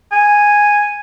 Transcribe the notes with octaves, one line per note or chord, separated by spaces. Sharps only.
G#5